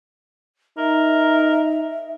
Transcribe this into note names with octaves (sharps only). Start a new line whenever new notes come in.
D#4 A#4 E5